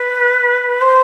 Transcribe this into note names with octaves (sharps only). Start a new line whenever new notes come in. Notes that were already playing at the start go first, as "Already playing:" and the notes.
Already playing: B4
C5